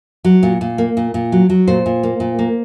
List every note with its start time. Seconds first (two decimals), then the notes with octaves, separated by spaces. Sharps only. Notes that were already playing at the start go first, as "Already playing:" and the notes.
0.24 F#3
0.43 A#2
0.61 A#2
0.78 A#3
0.97 A#2
1.14 A#2
1.32 F#3
1.50 F#3
1.68 A#2 C5
1.86 A#2
2.03 A#3
2.20 A#2
2.39 A#3